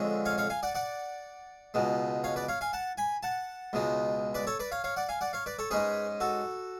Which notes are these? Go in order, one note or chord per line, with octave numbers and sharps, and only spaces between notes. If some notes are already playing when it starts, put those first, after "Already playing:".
Already playing: F2 D3 G#3 C#4
C#5 F5
C#5 F5
F5 G#5
D5 F#5
D5 F#5
C#2 B2 G#3
C#5 F5
B4 D5
C#5 F5
F5 G#5
F#5 A5
G#5 B5
F#5 A5
C#2 B2 G#3
B4 D5
A4 C#5
B4 D5
C#5 F5
C#5 F5
D5 F#5
F5 G#5
D5 F#5
C#5 F5
B4 D5
A4 C#5
G#2 G#3 C#4 G#4 B4
F#4 A4